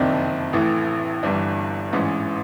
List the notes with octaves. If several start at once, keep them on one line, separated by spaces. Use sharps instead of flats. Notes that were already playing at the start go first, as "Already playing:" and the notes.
Already playing: F#1 F2 C3 D#3 D4
A1 A2 E3
G1 G2 E3 D4
A1 G#2 E3 C#4